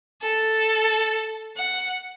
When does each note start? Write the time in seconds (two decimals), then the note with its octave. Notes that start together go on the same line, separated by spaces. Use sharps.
0.22 A4
1.57 F#5